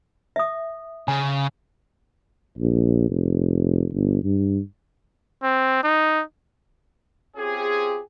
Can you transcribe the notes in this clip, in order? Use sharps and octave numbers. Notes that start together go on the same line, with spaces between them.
E5 D#6
C#3 G#5
A#1
F1
G1
G2
C4
D#4
C4 C#4 F4 G4 G#4